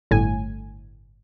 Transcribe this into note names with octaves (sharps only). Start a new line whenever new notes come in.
G1 A2 G#5